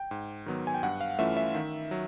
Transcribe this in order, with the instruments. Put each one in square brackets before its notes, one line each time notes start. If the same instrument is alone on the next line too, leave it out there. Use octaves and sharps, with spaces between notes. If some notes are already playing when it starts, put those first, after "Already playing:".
Already playing: [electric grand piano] G5
G#2
D#3 F#3 B3
G#5
G5
G2 F#5
F5
E3 A3 C#4 F4 E5
E5
D#3
F#3